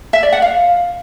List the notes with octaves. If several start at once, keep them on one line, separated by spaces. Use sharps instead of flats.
E5
D5
F#5
F5